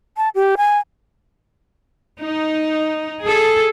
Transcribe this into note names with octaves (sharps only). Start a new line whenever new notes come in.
A5
G4
G#5
D#4
G#4 A4